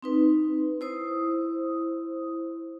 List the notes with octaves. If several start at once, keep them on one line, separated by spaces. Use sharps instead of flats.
C4 D#4 B4
E4 C5 D#6